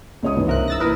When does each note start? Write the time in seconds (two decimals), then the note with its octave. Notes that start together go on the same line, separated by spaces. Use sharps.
0.23 C#2 C#5 D#6
0.35 G2 E3 D#4
0.47 C2 A#4 C5 E5 F#6
0.68 E6 A6 A#6
0.80 A#2 E4 A#4 B4 D#6